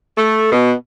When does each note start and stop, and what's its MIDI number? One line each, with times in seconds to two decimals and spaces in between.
0.17 0.50 57
0.52 0.72 47